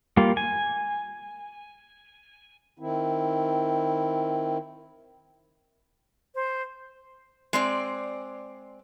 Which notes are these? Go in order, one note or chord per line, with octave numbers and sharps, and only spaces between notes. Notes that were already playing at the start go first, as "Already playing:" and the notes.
G3 A#3 F4
G#5
D#3 C4 E4
C5
G#3 C4 D5